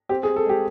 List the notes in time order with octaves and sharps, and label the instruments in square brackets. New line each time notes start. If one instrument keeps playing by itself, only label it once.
[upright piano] C4 G4
G#4
C4
A4
G#3 G4